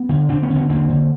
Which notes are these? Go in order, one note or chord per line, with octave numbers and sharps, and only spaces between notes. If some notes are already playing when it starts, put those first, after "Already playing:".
Already playing: B3
D3
D3 C4 D4
B3 C#4
D3
B3 C#4
D3 A#3 C4
D3